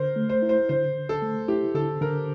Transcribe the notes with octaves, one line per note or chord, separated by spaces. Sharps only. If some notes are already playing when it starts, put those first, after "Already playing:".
Already playing: D3 A#4 C5
A3
C5
E4
C5
D3 C5
D3
A4
A3
E4 G4
D3 A4
D3 A#4